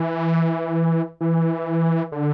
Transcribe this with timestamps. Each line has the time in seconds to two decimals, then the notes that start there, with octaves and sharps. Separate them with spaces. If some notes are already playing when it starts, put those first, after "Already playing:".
Already playing: E3
1.21 E3
2.12 D3